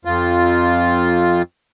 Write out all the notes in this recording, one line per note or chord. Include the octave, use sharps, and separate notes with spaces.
F2 F4